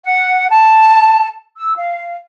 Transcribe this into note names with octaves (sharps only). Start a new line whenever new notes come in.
F#5
A5
E6
F5